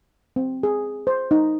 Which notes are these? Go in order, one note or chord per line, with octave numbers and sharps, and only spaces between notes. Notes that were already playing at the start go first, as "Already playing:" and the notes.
C4
G#4
C5
D#4